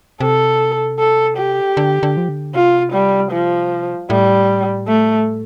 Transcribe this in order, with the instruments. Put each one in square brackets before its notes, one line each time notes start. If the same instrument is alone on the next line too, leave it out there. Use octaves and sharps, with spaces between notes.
[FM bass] C3 [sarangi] A4
[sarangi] A4
G4
[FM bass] D3
D3
F3
D3
[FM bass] C3 [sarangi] F4
[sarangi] G3
F3
[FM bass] A2 [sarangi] G3
[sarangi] A3